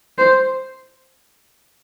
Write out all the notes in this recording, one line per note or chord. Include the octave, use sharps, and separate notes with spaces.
C5